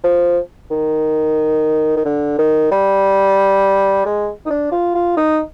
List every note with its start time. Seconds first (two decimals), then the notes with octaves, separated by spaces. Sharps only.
0.04 F3
0.71 D#3
1.97 D#3
2.05 D3
2.38 D#3
2.71 G3
4.05 G#3
4.45 D#4
4.50 D4
4.72 F4
4.95 F4
5.17 D#4